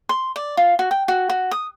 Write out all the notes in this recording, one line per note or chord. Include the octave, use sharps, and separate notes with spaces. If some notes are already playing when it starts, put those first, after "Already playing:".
C6
D5
F4
F#4
G5
F#4
F#4
D#6